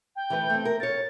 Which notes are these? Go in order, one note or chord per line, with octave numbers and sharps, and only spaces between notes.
G5
E3 A3 B4
A3 C4
A#4
A#4 C#5 A6